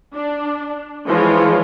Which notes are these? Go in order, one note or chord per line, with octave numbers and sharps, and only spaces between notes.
D4
E3 F3 G#3 F4 C#5